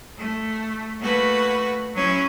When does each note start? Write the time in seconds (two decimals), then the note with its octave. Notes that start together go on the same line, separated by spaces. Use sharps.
0.17 A3
1.00 A3 A#3 F#4 B4
1.94 F#3 C#4 E4